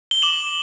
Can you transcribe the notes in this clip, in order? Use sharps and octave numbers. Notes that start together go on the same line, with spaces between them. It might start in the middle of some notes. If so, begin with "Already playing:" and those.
G7
D6 E7 F#7